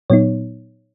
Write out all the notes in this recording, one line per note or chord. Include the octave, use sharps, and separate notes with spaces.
A#2 F#3 B3 D#4 C#5